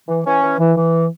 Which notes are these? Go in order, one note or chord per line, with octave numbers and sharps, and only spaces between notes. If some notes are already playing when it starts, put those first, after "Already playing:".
E3
E3 C#4
E3
E3
E3